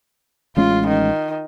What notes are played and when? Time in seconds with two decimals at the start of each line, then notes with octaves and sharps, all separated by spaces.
0.57 A1 G#3 C#4 F4
0.88 D#3